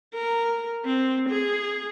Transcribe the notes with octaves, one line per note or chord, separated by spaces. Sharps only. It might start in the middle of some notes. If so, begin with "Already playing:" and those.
A#4
C4
G#4